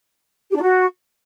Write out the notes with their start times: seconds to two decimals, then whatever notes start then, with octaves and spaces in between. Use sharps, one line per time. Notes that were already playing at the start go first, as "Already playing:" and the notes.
0.50 G4
0.56 D4
0.62 F#4